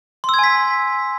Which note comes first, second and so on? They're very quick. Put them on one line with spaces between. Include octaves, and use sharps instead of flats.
C6 E6 G#6 G#5 B6